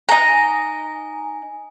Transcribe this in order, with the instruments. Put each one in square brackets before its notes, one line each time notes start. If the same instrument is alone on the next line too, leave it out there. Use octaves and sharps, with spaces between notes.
[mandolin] D#4 A#5 [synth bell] G#5